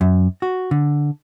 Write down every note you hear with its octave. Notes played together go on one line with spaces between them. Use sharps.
F#2
F#4
D3